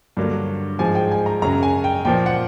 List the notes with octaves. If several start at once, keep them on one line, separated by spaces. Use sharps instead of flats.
G2 D3 F#3 A#3
G#2 F3 G#3 G#5
G5
G#5
A#5
F#2 C#3 F#3 A#5
G#5
G5
A#2 F3 A#3 G5
F#5